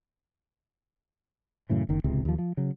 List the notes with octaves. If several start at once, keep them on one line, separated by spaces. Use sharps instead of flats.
F#2 A2 C#3 E3
F#1 D#3
D1 C#2 C3
D#2 F3
F3
C#3 F#3